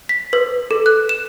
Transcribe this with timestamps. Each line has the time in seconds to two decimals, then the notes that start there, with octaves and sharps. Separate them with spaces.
0.09 B6
0.33 B4
0.71 A4
0.86 F#6
1.09 E7